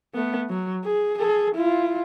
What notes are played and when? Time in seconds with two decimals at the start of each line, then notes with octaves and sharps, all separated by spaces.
0.14 A3 B3
0.49 F#3
0.84 G#4
1.18 G#4 A4
1.55 E4 F4